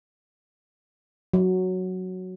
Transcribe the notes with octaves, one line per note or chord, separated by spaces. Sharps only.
F#3